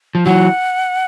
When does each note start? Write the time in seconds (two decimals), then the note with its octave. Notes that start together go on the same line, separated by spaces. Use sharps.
0.15 F3
0.26 E3 F#3 F#5